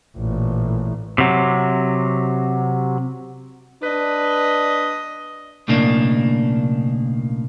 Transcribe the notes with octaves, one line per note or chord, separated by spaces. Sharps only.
A1 A#2
C3 F#3
D4 B4 D#5
B1 A2 C#3 A#3 D4